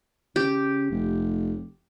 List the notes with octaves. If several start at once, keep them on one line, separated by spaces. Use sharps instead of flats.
C#3 G4
F1